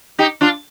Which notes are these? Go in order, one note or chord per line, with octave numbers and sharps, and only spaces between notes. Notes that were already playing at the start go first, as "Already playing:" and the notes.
D#4 G4
D4 F4